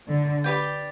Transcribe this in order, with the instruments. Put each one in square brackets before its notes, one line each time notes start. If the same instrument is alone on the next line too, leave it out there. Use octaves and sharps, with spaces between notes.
[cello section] D3
[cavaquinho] G4 B4 D5 G5